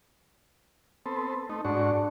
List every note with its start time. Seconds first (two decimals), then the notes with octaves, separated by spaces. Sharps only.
1.06 B3 C4 A4
1.50 A3 D#4
1.65 G#2 D4 F#4 C#6